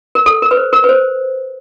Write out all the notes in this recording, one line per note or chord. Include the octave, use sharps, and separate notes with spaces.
A#4
A4
A#4
B4
C5
A#4
B4
C5